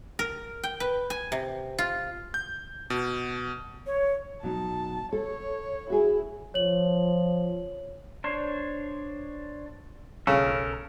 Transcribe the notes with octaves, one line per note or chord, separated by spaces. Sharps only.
A#4
G5
B4
G#5
C3
F4
G6
B2
C#5
B2 F#3 D#4 A5
A4 C#5
E4 F#4 G#4
F3 C#5 F#7
D4 C5 C#5
B1 C#3 A4 A#4